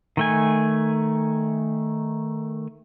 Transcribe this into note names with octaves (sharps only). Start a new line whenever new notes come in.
D#3 A3 G#5